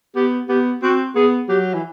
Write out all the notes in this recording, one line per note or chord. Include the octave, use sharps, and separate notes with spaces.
B3 G4
B3 G4
C4 F#4
B3 G#4
F#3 G4
E3